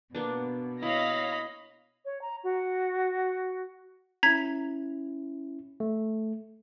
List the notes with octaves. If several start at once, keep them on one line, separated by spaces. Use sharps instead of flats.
B2 A#3 B3 D4
E4 C#5 D#5 F5 B5 A#6
C#5
A#5
F#4
C#4 E4 A#5 G#6 B6
A3